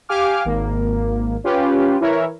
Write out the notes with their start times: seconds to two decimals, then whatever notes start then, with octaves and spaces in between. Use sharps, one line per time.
0.09 G4 F5 G#5 D6 F6
0.45 G#1 A#3
1.44 C#4 F4 G4 B4
2.00 E3 E4 A#4 C#5 E5